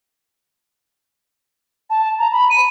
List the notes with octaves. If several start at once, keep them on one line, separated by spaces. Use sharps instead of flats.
A5
A#5
B5
D#7